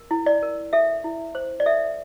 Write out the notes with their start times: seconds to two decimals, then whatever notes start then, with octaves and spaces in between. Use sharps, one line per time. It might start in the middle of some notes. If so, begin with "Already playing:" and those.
Already playing: A#4
0.11 E4
0.26 D5
0.43 A#4
0.73 A4 E5
1.04 E4
1.35 C5
1.60 D5
1.66 A4 E5